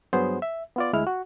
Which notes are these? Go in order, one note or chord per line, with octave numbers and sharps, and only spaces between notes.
G2 F#3 B3 G#4 C5
E5
B3 F4 D5
D2 G#3 E4 F6
F#4